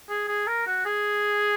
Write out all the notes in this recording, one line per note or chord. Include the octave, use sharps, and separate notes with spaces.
G#4
G#4
A#4
F#4
G#4